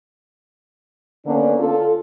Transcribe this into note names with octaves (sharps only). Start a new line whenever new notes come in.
D3 A#3 B3 C#4 D4
F4 A4